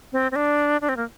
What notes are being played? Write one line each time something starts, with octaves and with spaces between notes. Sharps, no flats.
C4
C4
D4
D4
C4
A#3